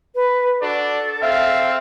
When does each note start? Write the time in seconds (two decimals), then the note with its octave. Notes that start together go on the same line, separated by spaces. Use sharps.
0.15 B4
0.61 D4 F#4 A4 D5
1.22 C4 E5 F5